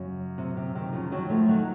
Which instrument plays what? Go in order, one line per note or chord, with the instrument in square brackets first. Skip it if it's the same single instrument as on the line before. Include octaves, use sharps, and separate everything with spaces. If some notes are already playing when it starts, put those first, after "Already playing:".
Already playing: [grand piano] F#2 [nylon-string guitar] C#3
[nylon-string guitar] C3
C3
C3 D#3
C#3 F3
D#3 F#3
F3 A3
D#3 F#3